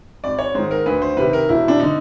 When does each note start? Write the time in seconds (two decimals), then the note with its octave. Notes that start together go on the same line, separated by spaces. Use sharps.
0.24 G#1 D5
0.39 C#5
0.55 G#2 D#3 C5
0.71 A#4
0.86 D2 B4
1.02 C5
1.17 C3 D#3 B4
1.33 A#4
1.49 E1 E4
1.68 D4
1.80 D3 D#4